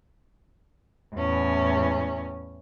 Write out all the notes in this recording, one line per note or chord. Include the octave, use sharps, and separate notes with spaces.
E2 A2 C#4